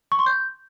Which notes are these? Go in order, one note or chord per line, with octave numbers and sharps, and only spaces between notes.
C#6
C6
G6